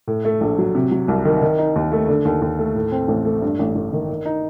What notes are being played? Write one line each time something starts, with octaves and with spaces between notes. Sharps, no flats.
A2
A3
A#1
F#3
C3
F#3
C2
D#3
D#3
D#4
D#2
A3
D3
D#2
D#2
A3
A2
C4
A1
A3
G2
A1
A1
D#3
D#3
D#4